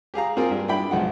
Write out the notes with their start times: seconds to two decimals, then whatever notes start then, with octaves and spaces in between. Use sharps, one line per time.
0.14 G4 G#4 F5 A#5
0.37 A#3 C4 F4 G#4 A#4
0.51 G2
0.68 D4 E4 G5 B5
0.91 B1 F3 G#3 F#5